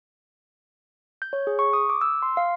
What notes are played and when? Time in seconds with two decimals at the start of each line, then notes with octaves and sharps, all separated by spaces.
1.22 G6
1.33 C#5
1.47 G#4
1.59 C#6
1.73 D#6
1.90 D6
2.01 E6
2.22 C6
2.37 F5